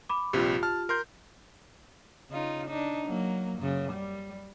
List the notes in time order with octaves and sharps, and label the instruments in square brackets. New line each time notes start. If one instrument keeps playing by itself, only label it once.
[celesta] B5 D6
[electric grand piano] A#1 G2 C3 [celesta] F4 G4
[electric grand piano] A5 F6
A#4 C6 G6
[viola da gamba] C#3 D#4 F4
D4 D#4
F#3 A#3
F#2 C#3
G3